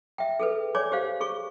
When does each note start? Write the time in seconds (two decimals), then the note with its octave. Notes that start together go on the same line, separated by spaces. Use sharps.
0.18 E5 G5
0.40 G#4 A4 B4
0.75 C#5 D5 G#5 D6
0.92 G4 C5 F5
1.21 G#4 C#6